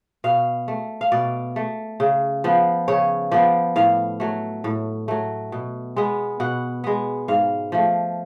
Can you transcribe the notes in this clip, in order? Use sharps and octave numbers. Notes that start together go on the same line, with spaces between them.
B2 F5
A3
F5
B2 D5
A3
C#3
F3 B3
C#3 C#5
F3 B3 D5
A2 F5
F#3 A3
A2
F#3 A3
B2
G#3 B3
B2 F#5
G#3 B3
G#2 F5
F3 A3